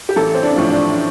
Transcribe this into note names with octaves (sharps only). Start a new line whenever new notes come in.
G4
A1 A4
C4
D4
A2 F3
D4